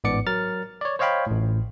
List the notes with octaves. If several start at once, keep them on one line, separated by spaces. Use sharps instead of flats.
A1 G#2 B3 D5 D6 C#7
F#3 A#4 F6 A6
C#5 D5
C5 C#5 D#5 F5 G5 B5
A1 A2